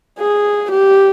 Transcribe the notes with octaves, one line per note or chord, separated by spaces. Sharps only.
G#4
G4